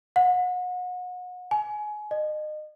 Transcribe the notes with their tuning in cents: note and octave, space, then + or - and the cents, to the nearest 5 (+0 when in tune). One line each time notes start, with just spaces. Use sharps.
F#5 -35
G#5 +25
D#5 -30